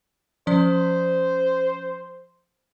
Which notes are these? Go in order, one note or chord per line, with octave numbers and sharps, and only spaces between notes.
F3 C#4 C5 D5